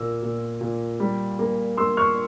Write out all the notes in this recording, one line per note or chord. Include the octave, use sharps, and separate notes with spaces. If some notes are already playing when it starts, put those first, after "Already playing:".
Already playing: A#2 A#3 E6
A#2
A#2
G3
A#3
A#3 C6 E6
C#6 F6